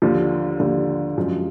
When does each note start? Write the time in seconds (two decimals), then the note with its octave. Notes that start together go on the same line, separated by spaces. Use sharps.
0.02 D#2 D3 F3
0.60 D#2 D3 F3
1.17 F#2 F3 G#3